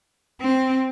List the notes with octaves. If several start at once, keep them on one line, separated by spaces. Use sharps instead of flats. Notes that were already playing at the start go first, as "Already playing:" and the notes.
C4